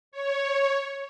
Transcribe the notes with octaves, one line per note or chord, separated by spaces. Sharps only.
C#5